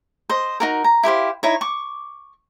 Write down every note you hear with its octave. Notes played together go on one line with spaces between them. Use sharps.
C5 D#5
D#4 F#4 A#4
A#5
E4 G4 C5 F5
D#4 E4 C#5
C#6 D6